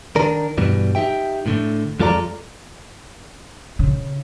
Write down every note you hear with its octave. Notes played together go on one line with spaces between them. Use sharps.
D#3 D4 A#4
G2 B2 E3 G3
D#4 G4 E5 G5
A2 D3 A3
F2 G#3 F4 A4 D5 A#5
C#3